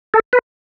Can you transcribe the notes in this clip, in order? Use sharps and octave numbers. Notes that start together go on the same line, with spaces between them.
A4
B4